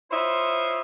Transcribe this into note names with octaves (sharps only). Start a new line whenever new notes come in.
E4 F4 C5 C#5 D#5 E5